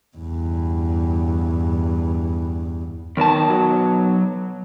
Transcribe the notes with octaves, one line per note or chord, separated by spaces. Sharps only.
E2 G2
B1 D#3 A5
F#3